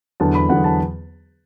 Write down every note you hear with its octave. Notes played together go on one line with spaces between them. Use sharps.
E2 D3 F#3 B3 A5
B5
E2 D3 F#3 B3 F#5
A5